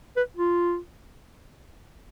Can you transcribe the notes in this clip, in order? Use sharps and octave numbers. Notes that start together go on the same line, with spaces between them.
B4
F4